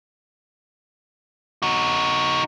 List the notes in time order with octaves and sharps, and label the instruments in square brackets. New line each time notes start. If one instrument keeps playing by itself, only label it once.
[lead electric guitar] D#4 F#4